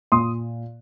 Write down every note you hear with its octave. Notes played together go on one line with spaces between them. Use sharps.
A#2 C6 D#6